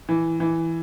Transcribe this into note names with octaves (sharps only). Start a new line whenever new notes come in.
E3
E3